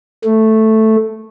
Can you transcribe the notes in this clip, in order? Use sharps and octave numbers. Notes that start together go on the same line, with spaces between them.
A3